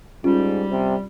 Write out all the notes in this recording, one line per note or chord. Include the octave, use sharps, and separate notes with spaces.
G#2 G3 C#4 F4
C3